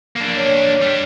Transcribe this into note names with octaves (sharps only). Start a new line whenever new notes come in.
A#3 D4
C#5
G3 D4